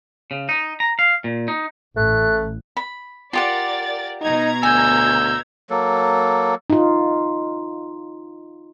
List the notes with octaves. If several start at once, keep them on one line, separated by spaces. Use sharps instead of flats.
C#3
D#4
A#5
F5
A#2
D#4
A1 A3 F#6
B5
F4 G4 A#4 D5 F#5 A6
B2 D#4 A#5 G#6
D2 G#5 E6 G6
F#3 A#3 A4
D#4 F4